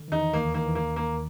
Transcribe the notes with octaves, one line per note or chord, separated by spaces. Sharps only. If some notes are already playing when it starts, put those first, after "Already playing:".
Already playing: D3
D#3
E2 E3 D#4
D#2 D#3 A#3
D#3 A#3
E3
D#2 D#3 A#3
A#3